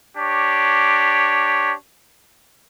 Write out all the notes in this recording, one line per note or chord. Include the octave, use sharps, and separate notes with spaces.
D4 G4 C#5